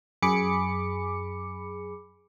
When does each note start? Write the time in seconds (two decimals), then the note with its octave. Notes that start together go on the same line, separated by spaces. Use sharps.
0.22 F#2 G#4 B5 D6 C#7